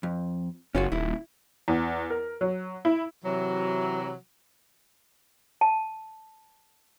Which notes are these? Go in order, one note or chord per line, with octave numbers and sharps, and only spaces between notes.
F2
F#1 C#4 F4 F#4
D#1 E4
E2
A#4
F#3
E4
C3 E3 F#3
A5